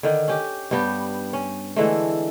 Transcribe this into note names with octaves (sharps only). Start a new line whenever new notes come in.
D3 D#3
C#4 G4
G2 G3 B3 G4
C#4
D3 E3 G#3 A3